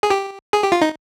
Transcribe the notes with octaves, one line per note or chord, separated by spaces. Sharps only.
G#4
G4
G#4
G4
F4
D#4